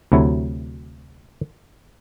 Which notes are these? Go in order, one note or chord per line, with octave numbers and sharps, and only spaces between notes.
D2 C3 F#3 E4 C#5